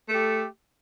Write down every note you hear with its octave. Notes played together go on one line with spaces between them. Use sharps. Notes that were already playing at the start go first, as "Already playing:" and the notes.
A3 G4 A4